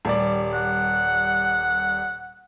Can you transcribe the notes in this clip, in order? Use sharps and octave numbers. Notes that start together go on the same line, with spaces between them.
D#1 G3 D5
F#5